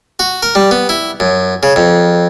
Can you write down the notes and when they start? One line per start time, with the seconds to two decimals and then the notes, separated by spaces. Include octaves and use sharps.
0.19 F#4
0.43 A#4
0.55 G3
0.71 B3
0.89 E4
1.20 F#2
1.63 C#3
1.76 F2